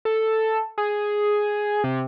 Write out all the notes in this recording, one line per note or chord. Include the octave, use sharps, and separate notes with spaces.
A4
G#4
C3